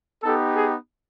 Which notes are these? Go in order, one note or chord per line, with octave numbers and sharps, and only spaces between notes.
B3 D#4 G4 A4
G#4